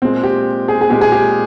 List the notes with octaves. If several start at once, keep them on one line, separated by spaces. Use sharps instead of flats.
A#2 G#3 C4
G4
G#4
G#4
A#2 G#3 G4
G#4
G4